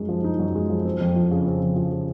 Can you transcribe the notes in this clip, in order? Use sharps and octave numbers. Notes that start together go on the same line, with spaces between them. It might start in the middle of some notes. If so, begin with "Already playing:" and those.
Already playing: F#2 G#3 D#4
F3
D#4
F#2
G#3
F3
C4
F2
F3
C#3
C4
F2
F3
C#3